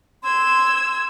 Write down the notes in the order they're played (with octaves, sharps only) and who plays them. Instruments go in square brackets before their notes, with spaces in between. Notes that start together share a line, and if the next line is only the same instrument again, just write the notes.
[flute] C6 [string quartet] E6 G#6